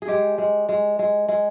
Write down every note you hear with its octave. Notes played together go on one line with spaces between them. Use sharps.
G#4
G#3 G4
G#3
G#3
G#3
G#3